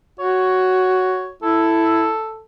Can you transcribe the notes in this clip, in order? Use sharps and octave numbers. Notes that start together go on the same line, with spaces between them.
F#4 C#5
E4 A4